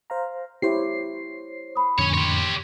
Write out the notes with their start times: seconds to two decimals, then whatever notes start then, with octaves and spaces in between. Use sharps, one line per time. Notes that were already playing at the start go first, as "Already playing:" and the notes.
0.10 C5 F5 A#5
0.62 E4 G4 C5 C#5 C7
1.76 B5 D#6
1.98 F2 A2 D3 C#4 C#5
2.14 G4 C#5 C6